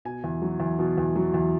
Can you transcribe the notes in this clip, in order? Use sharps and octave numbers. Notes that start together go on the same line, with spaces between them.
B2 G#5
E2
F#3
E2
B2
E2
F#3
E2